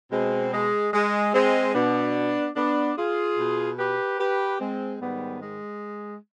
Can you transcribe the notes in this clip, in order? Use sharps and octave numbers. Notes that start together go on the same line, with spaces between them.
B2 G#3 C4
G#3
G#3
G#3 C4
B2 B3 D4
B3 D4
F4 G#4
B2
G4 B4
G4 B4
G#3 C4
G#2 D#3 G3 B3
G#3